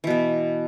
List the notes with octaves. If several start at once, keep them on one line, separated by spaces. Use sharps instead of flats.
B2 E3 B3